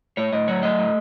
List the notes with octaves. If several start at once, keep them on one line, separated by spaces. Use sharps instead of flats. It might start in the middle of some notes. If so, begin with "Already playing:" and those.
A2 C#5
A2 D#5
F#3 C#5
A3 D#5
A2